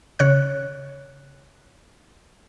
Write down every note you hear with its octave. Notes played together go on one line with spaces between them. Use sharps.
C#3 C#5 F#6